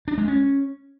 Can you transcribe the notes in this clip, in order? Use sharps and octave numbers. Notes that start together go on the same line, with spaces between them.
D4
G#3
C#4